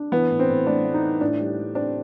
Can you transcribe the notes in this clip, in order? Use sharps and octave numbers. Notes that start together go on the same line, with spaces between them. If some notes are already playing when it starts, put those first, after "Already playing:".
Already playing: D4
E3 B3
A2
C4
A2
A3 D4
A3
D#4
C4
A2 D4
G3
G3
C4 D4